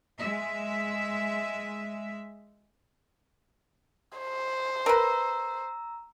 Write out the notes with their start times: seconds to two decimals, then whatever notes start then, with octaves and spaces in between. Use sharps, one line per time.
0.19 G#3 E5
4.18 C5
4.86 A#4 B4 A#5 E6